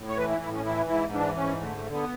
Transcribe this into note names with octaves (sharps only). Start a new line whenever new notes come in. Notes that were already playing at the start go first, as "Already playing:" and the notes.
Already playing: A2
C#5
E3 B4
E4
A2 E4
C#4
E3 E4
G#2 E4
E3 D4
G#2 C#4
D3 A3
A3
D3
B3